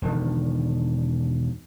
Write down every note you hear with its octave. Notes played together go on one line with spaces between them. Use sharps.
E1 D3 D#3